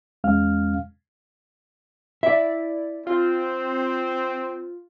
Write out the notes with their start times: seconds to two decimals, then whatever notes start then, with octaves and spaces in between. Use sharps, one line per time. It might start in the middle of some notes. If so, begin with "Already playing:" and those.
0.24 E2 G#3 C#4 F5 F6
2.23 E4 D5 E5
3.07 C4 F4